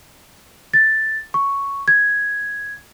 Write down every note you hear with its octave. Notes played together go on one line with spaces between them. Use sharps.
A6
C#6
G#6